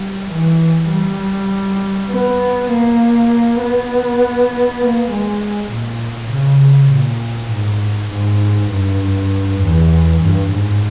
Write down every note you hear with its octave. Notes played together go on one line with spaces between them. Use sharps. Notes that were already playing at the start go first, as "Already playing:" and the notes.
Already playing: G3
E3
G3
B3
A#3
B3
A#3
G#3
A#2
C#3
A#2
G#2
G#2
G2
E2
G2
G#2